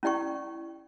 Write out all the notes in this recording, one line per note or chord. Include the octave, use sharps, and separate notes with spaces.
C#4 E4 D5 G5 C#6